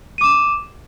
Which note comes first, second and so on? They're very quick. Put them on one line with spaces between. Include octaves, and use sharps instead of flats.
D#7 D6 E7